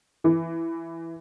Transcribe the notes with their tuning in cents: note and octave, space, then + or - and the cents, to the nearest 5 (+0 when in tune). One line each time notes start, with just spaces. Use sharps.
E3 +5